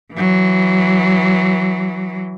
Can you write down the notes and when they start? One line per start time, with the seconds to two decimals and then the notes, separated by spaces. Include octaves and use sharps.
0.13 E3 F#3